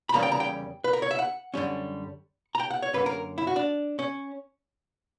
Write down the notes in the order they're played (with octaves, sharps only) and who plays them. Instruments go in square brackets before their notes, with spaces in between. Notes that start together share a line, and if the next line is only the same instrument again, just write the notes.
[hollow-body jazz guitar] B5
E2 C#3 G3 A#3 C#4 A#5
G5
A#5
G5
B4
A#4
C#5
E5
F#5
F#2 D3 G3 C#4
A#5
G5
F#5
C#5
F#2 D3 A#3 C#4 B4
A#4
E4
F#4
D4
C#4